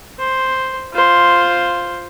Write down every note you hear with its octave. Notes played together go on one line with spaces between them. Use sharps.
C5
F4 C5